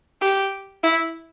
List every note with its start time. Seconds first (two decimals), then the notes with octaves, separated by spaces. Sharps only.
0.21 G4
0.83 E4